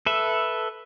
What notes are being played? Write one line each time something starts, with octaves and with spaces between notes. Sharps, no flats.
A4 B4 E5